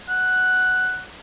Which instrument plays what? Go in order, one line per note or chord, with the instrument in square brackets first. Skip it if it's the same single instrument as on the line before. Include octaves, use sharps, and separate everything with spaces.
[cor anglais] F#5